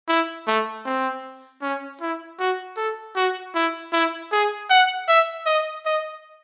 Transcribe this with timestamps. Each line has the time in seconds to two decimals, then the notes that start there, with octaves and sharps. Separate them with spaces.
0.08 E4
0.47 A3
0.85 C4
1.62 C#4
2.01 E4
2.39 F#4
2.77 A4
3.16 F#4
3.55 E4
3.93 E4
4.32 G#4
4.70 F#5
5.08 E5
5.46 D#5
5.85 D#5